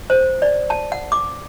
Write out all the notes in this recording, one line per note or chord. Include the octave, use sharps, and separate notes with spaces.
C5
D5
A5
F#5
D6